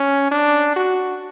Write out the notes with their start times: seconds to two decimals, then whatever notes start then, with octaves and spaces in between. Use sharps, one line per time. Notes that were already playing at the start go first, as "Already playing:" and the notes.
Already playing: C#4
0.32 D4
0.76 F#4